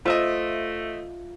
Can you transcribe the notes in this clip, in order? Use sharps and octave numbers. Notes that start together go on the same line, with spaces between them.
A3 F4 C5 D#5 E5